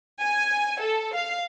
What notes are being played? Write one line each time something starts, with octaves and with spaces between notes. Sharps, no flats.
G#5
A4
F5